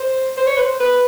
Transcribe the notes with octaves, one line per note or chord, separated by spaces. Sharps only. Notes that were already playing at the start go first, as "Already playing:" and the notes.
Already playing: C5
C5
C#5
B4
C5
B4